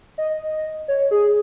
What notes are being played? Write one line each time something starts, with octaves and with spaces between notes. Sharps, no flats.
D#5
C#5
G#4